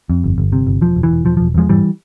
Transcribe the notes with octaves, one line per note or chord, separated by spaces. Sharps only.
F2
G1
G1
C3
G1
E1 F3
E1
E3
E1
E1 F3
E1 F3
E2 F3 G#3
G#2 E3 G3